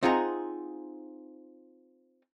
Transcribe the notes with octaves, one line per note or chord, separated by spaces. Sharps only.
C4 D#4 F4 G#4 F#5 A#5